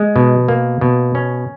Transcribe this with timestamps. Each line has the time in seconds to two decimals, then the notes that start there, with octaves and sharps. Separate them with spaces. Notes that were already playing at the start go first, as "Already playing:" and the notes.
Already playing: G#3
0.16 B2
0.48 A#3
0.81 B2
1.15 C#4